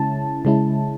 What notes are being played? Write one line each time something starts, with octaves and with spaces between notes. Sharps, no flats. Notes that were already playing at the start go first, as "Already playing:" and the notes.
Already playing: C#3 G#3 C#4 E4 A5
C#3 G#3 C#4 E4